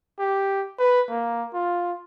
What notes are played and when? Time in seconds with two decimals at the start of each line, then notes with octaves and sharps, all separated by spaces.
0.19 G4
0.79 B4
1.09 A#3
1.53 F4